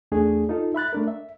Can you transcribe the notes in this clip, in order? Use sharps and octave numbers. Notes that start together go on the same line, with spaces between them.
E2 A3 D4 G#4
D#4 F4 A4
E5 B5 F#6 A6
A3 D4 A#4
E5